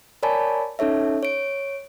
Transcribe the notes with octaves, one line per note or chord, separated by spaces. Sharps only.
A#4 C#5 D5 G#5 A5 B5
C#4 D#4 A4 C#5 E5
C#5 D7